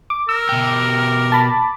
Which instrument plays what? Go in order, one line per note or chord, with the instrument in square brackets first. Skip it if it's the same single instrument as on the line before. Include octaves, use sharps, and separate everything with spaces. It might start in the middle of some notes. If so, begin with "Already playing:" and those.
[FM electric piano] D6
[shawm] A#4 [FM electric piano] E6
[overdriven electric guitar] B2 G4
[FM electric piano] A5 B5 D6